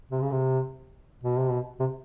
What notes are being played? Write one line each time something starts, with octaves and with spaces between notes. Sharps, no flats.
C3
C#3
C3
B2
C3
B2
C3